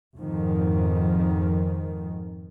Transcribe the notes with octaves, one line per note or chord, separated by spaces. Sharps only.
F2 G#2 D#3